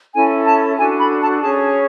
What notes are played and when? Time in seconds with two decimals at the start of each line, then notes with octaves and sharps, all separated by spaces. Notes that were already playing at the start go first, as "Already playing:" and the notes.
0.15 C#4 E4 A4 G#5
0.46 A5
0.78 D4 F#4 A4 G#5
0.99 B5
1.21 A5
1.41 C#4 G#4 C#5 A5